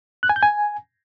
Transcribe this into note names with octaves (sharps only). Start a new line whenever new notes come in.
F#6
G#5
G6
G#5